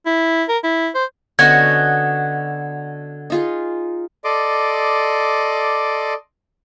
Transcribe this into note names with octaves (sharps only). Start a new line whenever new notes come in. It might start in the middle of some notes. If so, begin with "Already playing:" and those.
E4
A#4
E4
C5
D3 B3 C#4 F#4 D#5 F#5 G#6
D#4 F4 G#4
A4 D5 D#5 C6 D6